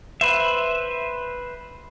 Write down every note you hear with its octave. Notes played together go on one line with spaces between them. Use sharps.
B4 C5 E5